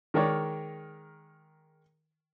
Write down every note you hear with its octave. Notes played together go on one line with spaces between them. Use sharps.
D#3 G#3 A#4 C#5 D5